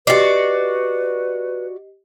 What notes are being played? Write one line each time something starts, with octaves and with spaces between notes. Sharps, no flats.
F#4 G4 B4 D5 D#5 C7